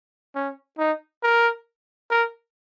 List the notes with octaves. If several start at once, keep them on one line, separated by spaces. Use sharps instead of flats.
C#4
D#4
A#4
A#4